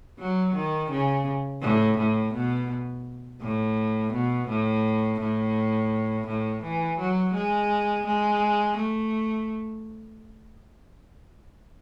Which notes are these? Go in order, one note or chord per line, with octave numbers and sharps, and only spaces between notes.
F#3
D#3
C#3
A2
A2
B2
A2
B2
A2
A2
A2
E3
F#3
G#3
G#3
A3